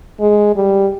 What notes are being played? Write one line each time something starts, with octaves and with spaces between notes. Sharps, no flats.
G#3
G3